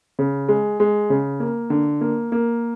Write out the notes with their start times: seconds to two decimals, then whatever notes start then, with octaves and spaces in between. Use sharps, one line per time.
0.19 C#3
0.49 G#3
0.80 G#3
1.10 C#3
1.40 A#3
1.70 D3
2.01 A#3
2.32 A#3